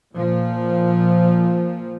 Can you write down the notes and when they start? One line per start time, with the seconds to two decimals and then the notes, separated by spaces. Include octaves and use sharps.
0.12 A#2 F3